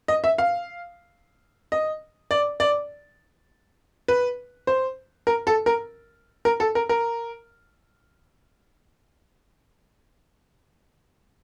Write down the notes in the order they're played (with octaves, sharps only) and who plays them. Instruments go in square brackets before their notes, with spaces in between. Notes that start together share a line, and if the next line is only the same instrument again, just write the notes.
[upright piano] D#5
E5
F5
D#5
D5
D5
B4
C5
A#4
A4
A#4
A#4
A4
A#4
A#4